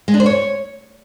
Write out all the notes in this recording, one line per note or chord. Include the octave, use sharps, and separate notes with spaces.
G#3
D4
C5
C#5